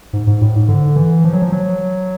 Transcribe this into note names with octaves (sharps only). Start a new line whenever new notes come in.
G#2
G#2
A2
G#2
D3
E3
F3
F#3
F3
F#3